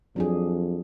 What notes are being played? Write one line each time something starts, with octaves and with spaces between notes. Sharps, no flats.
F2 F#3 D4 G#4